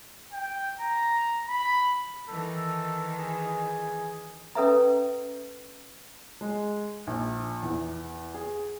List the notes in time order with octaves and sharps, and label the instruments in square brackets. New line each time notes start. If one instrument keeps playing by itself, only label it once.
[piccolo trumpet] G5
A#5
B5
[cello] D#3 E3 [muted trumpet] A4
[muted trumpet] G#4
[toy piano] C#4 A4 B4 E5 A#5
[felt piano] G#3
A#1
E2
G#4